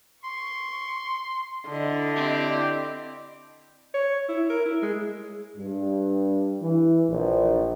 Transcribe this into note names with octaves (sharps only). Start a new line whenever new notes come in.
C6 C#6
D3 E4 D#5
C4 G4
C#5
E4
A#4
E4
G#3
G2
E3
A#1